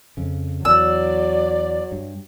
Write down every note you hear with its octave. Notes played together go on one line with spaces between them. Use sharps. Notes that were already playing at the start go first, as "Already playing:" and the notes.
F2 C#3
E2 F#3 D5 E6
G2